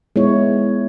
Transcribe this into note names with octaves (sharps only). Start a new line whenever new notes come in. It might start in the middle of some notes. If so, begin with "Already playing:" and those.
G#3 B3 E4 C#5